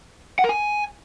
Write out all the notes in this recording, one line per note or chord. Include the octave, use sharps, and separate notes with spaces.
F#5
A#4
G#5